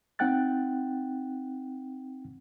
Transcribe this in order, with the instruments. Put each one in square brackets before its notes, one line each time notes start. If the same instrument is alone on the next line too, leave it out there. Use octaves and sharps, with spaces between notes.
[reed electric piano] C4 D#4 F#5 G5 F#6 A6